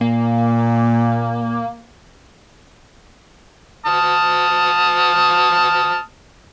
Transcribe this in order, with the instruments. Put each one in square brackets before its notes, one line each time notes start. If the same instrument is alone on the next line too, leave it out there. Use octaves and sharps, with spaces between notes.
[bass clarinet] A#2 [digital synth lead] A#3
[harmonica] A5 D#6 F6